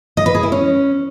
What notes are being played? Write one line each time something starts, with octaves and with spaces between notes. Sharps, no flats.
D#5
B4
G#4
E4
C#4